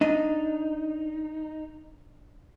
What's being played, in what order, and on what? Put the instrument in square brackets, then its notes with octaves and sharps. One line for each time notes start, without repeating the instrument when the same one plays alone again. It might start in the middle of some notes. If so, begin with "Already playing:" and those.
[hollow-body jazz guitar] D4 D#5 [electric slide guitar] D#4